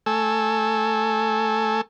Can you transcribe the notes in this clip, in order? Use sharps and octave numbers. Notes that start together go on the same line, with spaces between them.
A3 A4 G#5 E6